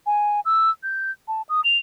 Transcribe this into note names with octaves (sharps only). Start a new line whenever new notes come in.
G#5
E6
G6
A5
D#6
F7